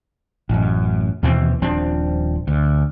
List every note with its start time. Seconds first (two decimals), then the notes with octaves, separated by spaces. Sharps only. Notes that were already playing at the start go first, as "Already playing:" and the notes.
0.49 A1 F#2
1.23 D#2 B2 E3 C4
1.62 D#1 F3 C4 D4
2.48 D2